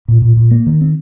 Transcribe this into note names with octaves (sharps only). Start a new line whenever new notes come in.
A#2
A#2
A#2
A#3
D#3
C4